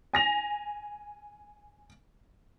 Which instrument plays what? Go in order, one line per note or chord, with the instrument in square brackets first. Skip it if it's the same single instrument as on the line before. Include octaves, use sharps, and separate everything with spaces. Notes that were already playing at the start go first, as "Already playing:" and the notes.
[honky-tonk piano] G#5 A#6 F7